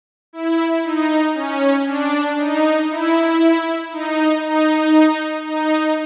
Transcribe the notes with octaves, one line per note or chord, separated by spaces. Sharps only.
E4
D#4
C#4
D4
D#4
E4
D#4
D#4
D#4